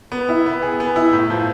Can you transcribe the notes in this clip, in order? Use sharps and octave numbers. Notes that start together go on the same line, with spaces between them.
B3
E4
B3
G#4
B3
E4
A2
F3